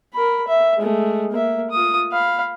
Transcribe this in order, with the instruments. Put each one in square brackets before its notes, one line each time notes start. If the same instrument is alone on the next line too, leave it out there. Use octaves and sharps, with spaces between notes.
[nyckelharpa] A#4 B5
E5
G#3 A3
A#3 E5
F4 D#6
F5 B5